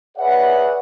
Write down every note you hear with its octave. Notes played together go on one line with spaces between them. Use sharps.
G#4 B4 C#5 D5 E5 F#5